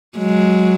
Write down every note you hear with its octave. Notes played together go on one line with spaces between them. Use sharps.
F#3 G#3